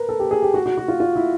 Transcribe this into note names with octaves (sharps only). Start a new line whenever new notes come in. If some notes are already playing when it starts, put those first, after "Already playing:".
Already playing: A#4 B4
A4
G4
G#4
G4
F#4
F#4
F#4
F4
F4
E4